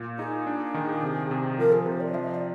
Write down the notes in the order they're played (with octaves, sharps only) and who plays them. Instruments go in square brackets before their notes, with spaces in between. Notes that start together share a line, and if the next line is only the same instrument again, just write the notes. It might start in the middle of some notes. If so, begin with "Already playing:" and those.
Already playing: [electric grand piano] A#2
[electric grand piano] D#4 [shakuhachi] G#4
[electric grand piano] D4
D#3
C3
C3
[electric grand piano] F3 [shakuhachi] A#4
[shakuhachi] G#4
[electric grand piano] C3 [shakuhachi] C5
[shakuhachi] D5
[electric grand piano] F3 [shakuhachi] F5
[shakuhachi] D#5
D5